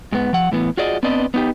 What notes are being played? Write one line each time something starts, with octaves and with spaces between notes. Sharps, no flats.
G#2 B3
F3 F#5
A2 E3 B3
F4 F#4 G#4 D5 D#5
B3 C4 D4 B4 D5 D#5
B3 D#4 G4